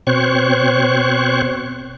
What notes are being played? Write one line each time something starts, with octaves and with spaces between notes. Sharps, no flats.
B2 C4 C5 C#5 C#6 F#6